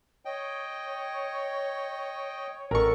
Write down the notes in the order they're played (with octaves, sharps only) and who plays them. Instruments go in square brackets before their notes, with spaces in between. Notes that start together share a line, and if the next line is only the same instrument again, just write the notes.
[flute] C#5 [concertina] D#5 G5
[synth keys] A1 C#6 [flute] A4 [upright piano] A#4